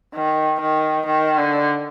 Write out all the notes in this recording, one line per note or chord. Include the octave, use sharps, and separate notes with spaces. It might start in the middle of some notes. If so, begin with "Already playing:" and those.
D#3
D#3
D#3
D3